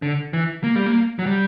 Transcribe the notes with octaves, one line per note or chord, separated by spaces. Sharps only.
D3
E3
A#3
G3
A#3
F#3
G3